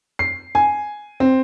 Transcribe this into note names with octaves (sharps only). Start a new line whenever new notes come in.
C7
G#5
C4